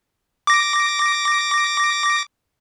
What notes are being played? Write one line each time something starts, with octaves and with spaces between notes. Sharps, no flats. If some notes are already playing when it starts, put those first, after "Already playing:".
D6 A#6